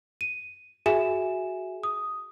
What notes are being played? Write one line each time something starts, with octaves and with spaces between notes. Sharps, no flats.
D#7
F#4 G#4 E5 G#5 E7
D#6